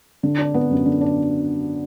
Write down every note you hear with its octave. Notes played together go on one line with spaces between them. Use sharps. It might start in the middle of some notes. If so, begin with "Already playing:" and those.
D3
D4
B3
F#2
D3
D4